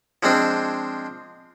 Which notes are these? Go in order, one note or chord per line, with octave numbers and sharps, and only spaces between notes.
F3 G#3 C4 D4